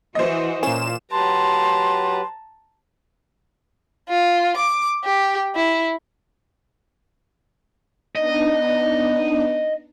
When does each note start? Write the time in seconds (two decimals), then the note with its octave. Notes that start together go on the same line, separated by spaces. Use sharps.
0.15 E3 F#4 C5 D#5
0.63 A#2 C#4 F4 E7
1.12 F#3 G4 B4 A5 A#5 C6
4.09 F4
4.57 D6
5.05 G4
5.55 E4
8.15 B3 D4 D#4 D#5